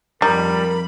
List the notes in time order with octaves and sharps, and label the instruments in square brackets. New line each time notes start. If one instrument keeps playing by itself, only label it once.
[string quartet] F2 B5 [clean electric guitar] G3 [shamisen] D#4 [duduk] A#4